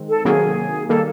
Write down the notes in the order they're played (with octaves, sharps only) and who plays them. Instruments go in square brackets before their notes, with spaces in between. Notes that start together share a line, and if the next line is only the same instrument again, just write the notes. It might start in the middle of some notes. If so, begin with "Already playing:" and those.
Already playing: [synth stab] D#3 G#3 C4
[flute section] A4
[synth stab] C3 D#3 F#3 A#3 [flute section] G#4
[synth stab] D#3 G3 A#3 [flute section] A4